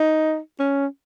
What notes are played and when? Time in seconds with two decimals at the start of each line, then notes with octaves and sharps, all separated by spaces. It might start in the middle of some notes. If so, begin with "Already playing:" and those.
Already playing: D#4
0.60 C#4